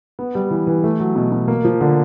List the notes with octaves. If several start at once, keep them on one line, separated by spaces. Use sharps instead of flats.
B3
G3
E3
E3
A3
F#3
B2
B2
A#3
F3
D3